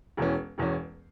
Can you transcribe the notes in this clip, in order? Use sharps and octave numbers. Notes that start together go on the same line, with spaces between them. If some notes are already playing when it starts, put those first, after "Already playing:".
E1 E2 E3 C#4
E1 E2 E3 C#4